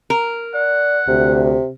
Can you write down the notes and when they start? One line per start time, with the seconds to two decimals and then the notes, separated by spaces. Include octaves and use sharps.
0.10 A#4
0.55 D5 F#5
1.08 D2 C3